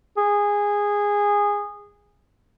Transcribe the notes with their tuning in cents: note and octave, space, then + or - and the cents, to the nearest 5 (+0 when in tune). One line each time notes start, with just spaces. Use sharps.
G#4 -15